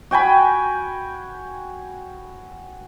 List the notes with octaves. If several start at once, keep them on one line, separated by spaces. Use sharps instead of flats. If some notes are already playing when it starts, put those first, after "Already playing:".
F#4 G5 G#5 B5